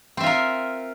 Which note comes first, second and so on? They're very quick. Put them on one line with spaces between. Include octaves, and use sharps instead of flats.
C4 E5 F4 A#4